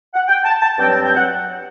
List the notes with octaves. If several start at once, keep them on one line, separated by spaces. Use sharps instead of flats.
F#5
G5
A5
A5
G2 F#3 C4 G5
A5
G5
F#5